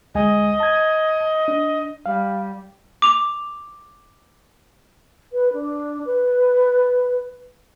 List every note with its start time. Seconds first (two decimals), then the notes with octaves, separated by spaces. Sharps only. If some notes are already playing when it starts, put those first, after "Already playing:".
0.15 D2 G#3 D#5 G#5
0.60 A5 G#6
1.48 D4
2.06 G3 F5
3.02 D6 F7
5.33 B4
5.53 D4
6.06 B4